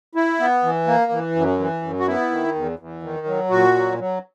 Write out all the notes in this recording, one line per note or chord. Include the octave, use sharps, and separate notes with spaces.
E4
B3
E3
A#3
E3
F#2
E3
F#2
F#4
B3 E4
D#3
E2
E2
D#3
F#3
A#2 F#4
F#3
F#3